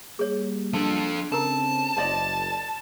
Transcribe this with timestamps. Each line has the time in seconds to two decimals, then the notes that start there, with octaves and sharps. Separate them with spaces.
0.19 G3 A#3 G#4 C#5
0.73 F3 D4 A4
1.32 C#3 C4 A4 A#4 A5 A#5
1.96 F#1 C5 D5 D#5